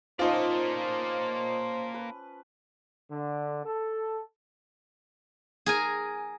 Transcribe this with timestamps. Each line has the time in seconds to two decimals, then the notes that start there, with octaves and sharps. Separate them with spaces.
0.19 F3 A#3 C#4 D#4 F4 C5 D5 D#6
1.94 B4
3.10 D3
3.65 A4
5.66 G#4 A#4 G#5